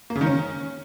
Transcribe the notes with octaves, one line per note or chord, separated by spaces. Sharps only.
A#3
C#3
D#3
C#4